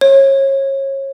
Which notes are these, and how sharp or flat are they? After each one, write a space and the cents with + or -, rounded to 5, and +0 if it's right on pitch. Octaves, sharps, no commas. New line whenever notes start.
C#5 -30